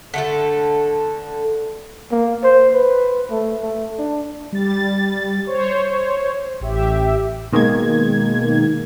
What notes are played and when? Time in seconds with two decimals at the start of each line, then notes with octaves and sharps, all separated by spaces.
0.14 D3 A3 A4
2.11 A#3
2.43 C5
2.74 B4
3.30 A3
3.62 A3
3.99 D4
4.52 G3 A6
5.47 C5 C#5
6.61 A1 G4 E5
7.52 B2 D#3 G#3 A#3 G#6